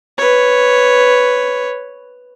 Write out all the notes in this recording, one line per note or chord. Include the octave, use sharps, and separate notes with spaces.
B4 C#5